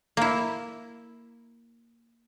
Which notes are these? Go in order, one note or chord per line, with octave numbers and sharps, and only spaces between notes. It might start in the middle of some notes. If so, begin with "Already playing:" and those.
A#3 E4